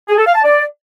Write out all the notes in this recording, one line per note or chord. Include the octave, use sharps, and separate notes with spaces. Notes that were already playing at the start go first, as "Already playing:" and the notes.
G#4
A4
F5
A5
D5